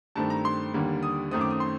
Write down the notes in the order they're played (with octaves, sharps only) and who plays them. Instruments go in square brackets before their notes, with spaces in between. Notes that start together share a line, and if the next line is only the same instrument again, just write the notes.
[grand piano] G2 D#3 A3 C4 A5
A#5
C6
D#2 D3 G3 A#3
D#6
F#2 D#3 A3 C4 D#6
D6
D#6
C6